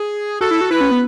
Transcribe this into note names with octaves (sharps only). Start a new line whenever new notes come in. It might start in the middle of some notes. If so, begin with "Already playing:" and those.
Already playing: G#4
F#4 A4
E4
F#4
E4 B4
C#4
B3